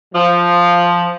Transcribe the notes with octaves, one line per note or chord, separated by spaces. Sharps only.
F3